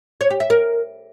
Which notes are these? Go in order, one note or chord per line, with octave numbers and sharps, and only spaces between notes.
C#5
G4
E5
A#4